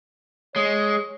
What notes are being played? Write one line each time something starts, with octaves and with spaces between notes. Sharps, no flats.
G#3 C#5